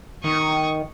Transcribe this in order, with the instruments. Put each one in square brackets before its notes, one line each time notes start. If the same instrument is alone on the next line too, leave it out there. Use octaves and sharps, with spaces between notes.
[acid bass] D#3 [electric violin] C#6 D#6